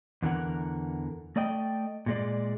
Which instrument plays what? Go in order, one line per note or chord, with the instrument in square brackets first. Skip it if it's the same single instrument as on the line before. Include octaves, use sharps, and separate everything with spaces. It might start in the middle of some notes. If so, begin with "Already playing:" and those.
[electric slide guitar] E2 D3 E3 A#4 F#5
A3 D5 D#5 G5
A#2 G#3 D5